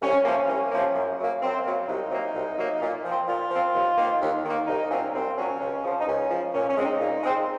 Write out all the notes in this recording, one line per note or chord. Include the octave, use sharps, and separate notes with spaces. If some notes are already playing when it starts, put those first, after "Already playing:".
C2 C#4
C3 F3 A#3 C#4
C2
C3 F3 A#3
F#2
C#3 F#3 A#3
F#2 C4
C#3 F#3 A#3
C2 D#4
C3 F#3 A#3
C2
C3 F#3 A#3
A#2
F3 C4
A#2 F4
F3 C4
D#2
D#3 A#3
D#2
D#3 A#3
C2 D#4
A#2 F#3 C4 C#4
C2 C4
A#2 F#3 C4 C#4
C#2
C#3 F3
D#4
C#2 C#4
C#3 F3
A#2 C#4
C#4
G#3 C4
D#4
A#2
G#3 C4